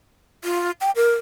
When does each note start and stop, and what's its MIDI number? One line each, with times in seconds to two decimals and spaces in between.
0.44 0.71 65
0.81 0.91 79
0.96 1.16 70